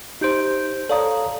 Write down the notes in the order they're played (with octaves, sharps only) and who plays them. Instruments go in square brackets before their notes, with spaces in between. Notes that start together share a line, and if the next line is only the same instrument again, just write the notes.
[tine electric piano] D#4 C5 [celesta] G4 G6 D7
[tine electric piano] A4 C#5 A#5 [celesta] D5 F5 D#6